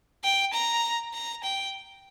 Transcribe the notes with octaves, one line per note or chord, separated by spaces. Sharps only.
G5
A#5
A#5
G5